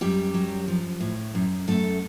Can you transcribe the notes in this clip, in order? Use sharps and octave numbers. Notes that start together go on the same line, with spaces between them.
F#2 G3 G4
F#3
F3
A2
F#2
F#2 A3 A4